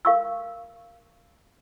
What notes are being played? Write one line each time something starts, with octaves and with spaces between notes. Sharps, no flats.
A#4 F5 C#6 E6